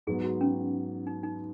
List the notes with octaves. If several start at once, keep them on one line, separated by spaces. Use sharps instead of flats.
G#2 F#3 B3 G#4
F#4
C#4
D#4
D#4